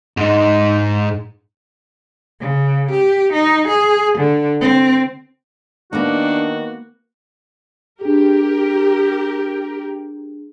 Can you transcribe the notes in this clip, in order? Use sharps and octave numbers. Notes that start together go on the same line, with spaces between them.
G#2 D#4
C#3
G4
D#4
G#4
D3
C4
D#3 A#3 B3 D4 F#4
D4 G4 G#4 A#4 G5